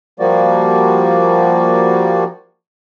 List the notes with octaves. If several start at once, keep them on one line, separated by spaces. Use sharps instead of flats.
F3 G3 A#3 F#4 D5